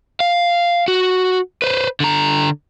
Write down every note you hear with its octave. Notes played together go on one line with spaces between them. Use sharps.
F5
F#4
B4 C5
D3 A#5